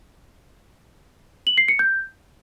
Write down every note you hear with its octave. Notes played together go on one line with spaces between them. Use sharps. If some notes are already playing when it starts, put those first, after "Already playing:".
F#7
C7
C#7
G6